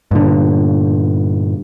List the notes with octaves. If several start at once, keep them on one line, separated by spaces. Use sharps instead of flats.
G2 A#2 D3